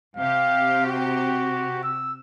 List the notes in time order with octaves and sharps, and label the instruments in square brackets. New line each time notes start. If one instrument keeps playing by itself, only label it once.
[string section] C3 G4 [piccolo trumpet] F5
[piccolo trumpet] F#4
E6